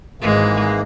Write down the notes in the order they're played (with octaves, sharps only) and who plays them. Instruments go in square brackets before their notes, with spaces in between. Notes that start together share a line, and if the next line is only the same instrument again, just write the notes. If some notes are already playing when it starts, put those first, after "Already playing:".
[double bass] G#1 [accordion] G#2 E3 A#3 [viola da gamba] G#3